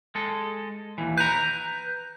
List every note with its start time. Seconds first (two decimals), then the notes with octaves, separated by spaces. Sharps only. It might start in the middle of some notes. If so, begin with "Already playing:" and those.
0.15 G#3 A4
0.98 D#2 E3
1.17 B4 A#5 G6